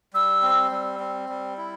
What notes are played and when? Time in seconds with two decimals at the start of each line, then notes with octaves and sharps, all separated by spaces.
0.14 G3 E6
0.42 C4
0.72 G3
1.00 C4
1.29 G3
1.58 E4